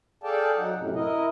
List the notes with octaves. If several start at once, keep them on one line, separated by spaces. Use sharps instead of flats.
G#4 A4 D5 F5 G5 A5
F#3 D#4 F#5
F#2 A2 C3
E4 A#4 D#5